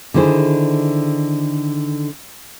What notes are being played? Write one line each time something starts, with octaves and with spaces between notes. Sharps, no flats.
D3 D#3 E4 G#4 C5